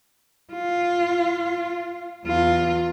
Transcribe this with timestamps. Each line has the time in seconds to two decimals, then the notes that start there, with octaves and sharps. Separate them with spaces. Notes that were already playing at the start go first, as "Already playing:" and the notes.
0.53 F4
2.26 E2 F4